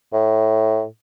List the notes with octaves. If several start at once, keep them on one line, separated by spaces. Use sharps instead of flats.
A2